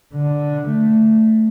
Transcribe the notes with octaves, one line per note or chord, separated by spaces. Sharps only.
D3
A3